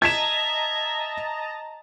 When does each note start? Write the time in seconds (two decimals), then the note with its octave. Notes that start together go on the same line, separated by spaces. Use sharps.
0.02 D#5 E5 A5 A#5 G#6 B6 E7